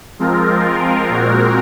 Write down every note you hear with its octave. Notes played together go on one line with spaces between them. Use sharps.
F3 G#3 C4 F4 A#4
A#2 G#3 C4 F#4 A#4